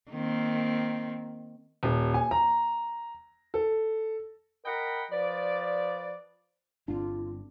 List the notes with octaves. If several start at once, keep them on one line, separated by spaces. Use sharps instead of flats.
D#3 A#3 C4
D#1
G#5
A#5
A4
A#4 D#5 F#5 G5 B5
F3 B4 D5
G1 C3 C4 D4 F4